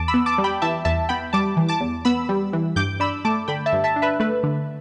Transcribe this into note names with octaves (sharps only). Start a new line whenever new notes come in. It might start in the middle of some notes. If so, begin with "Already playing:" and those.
Already playing: E2 A5 D6
B5 E6
B3
A5 D6
G3
G5 B5
E3 E5 A5
E2 E5 A5
B3 G5 B5
G3 A5 D6
E3
A5 D6
E2
B3 B5 E6
G3
E3
G2 D6 G6
D4 B5 E6
A3 A5 D6
D3 G5 B5
E5 A5
G2
E5 A5
D4
B4 E5
A3 B4
D3